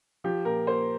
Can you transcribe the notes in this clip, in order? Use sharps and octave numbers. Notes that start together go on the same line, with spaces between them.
F3 G4
A#2 A#4
A#3 C5